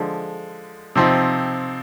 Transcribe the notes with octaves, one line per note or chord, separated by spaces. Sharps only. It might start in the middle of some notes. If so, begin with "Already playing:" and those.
Already playing: D3 F3 G#3
C3 F3 C4 D#4